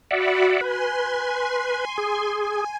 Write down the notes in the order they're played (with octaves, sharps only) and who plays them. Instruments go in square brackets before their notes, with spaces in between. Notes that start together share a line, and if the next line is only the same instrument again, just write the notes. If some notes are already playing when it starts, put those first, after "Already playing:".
[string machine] F#4 B5 [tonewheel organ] D5 E5 F#5
[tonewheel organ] B4 [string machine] G#5 C6
[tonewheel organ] G#4
[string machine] G#5